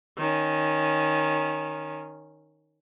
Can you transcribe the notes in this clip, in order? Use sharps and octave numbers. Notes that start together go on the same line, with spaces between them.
D#3 C#4